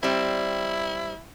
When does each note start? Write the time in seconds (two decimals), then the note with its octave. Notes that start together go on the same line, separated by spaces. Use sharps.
0.03 G3 C4 E4